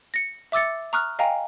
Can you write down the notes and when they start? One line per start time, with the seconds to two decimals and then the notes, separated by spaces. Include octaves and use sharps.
0.14 A#6 C#7
0.52 E5 D6 E6 A6 C#7
0.93 A#5 C#6 D#6 F6 F#6
1.19 D#5 F5 G5 G#5 A#5